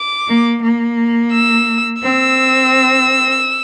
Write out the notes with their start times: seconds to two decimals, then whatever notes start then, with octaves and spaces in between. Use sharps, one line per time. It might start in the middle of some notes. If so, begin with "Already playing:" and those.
Already playing: D6
0.27 A#3
0.62 A#3
1.32 E6
2.02 C4 E6